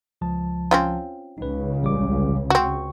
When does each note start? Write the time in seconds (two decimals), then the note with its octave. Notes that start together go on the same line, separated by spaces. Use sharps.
0.21 C#2 F3 A5
0.71 C4 C#4 F4
1.38 C#2 C#3 D#4 B4
1.82 A1 G3 D6
2.50 C4 F#4 C#6